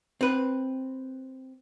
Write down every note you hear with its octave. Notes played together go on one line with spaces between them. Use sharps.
C4 B4